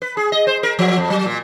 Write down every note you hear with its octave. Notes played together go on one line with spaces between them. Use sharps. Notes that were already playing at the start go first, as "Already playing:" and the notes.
B4
G#4
D#5
C5
A#4
F3
F2
F#3
A#2